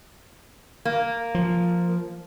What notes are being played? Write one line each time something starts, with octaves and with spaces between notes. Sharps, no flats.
A#3
F3